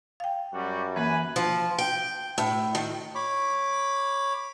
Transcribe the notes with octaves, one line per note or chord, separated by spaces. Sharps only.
F5 G5
F#2 G3 F#4
E3 A#3 B4 G#5
F3
G5
A2
D#3
C#5 B5 D6